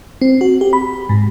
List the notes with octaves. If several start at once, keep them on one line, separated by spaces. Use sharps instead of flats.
C4
F#4
G4
B5
G#2